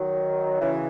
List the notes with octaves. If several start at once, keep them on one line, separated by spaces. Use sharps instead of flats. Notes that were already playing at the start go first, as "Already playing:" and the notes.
Already playing: D#3 F#3
C#3 E3